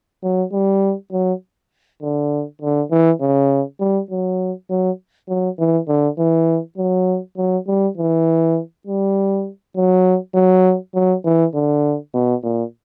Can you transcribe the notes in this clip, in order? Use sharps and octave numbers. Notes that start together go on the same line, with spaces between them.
F#3
G3
F#3
D3
D3
E3
C#3
G3
F#3
F#3
F#3
E3
D3
E3
F#3
F#3
G3
E3
G3
F#3
F#3
F#3
E3
D3
B2
A#2